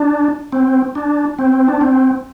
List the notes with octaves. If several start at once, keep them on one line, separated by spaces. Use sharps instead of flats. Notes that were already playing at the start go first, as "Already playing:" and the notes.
Already playing: D4
C4
D4
C4
D4
C4